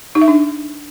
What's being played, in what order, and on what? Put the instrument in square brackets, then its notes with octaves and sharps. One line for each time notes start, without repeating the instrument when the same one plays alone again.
[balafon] D#4
E5
D4